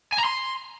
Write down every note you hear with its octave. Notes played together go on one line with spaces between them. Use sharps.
G#5
A#5
C6